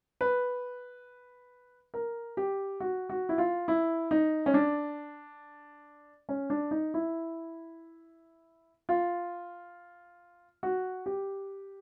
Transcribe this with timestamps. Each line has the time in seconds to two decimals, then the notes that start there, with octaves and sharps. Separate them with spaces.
0.21 B4
1.94 A#4
2.37 G4
2.80 F#4
3.09 F#4
3.29 E4
3.38 F4
3.68 E4
4.11 D#4
4.46 C#4
4.54 D4
6.29 C#4
6.50 D4
6.71 D#4
6.94 E4
8.89 F4
10.63 F#4
11.06 G4